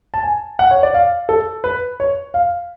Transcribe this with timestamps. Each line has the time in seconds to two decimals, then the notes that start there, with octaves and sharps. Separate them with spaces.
0.14 A5
0.23 G#5
0.59 F#5
0.71 C#5
0.83 D5
0.94 F5
1.29 A4
1.64 B4
2.00 C#5
2.34 F5